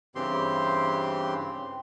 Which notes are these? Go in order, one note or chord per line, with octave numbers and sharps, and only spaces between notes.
G2 C#3 E3 C4 G4 C6